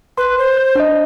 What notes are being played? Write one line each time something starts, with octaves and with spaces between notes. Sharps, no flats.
B4 C6
C5
G6
D4 D#5